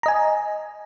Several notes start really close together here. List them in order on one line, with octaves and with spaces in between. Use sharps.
A#5 D#5 G#5